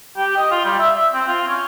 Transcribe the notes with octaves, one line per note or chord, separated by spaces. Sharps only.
G4
D#5
F4
G3
E5
E5
C4
F4
C#4